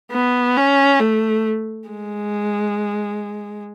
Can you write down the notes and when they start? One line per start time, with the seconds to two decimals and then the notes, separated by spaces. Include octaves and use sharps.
0.12 B3
0.56 C#4
1.00 A3
1.89 G#3